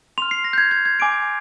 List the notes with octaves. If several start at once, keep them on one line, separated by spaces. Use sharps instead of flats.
C6 F6 F7
C7
A#6
G6
G#6
G#6
G#6
G#5 D6 G6 D7